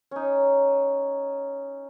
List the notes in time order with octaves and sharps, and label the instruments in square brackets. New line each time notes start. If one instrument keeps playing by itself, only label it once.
[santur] C#4 D#4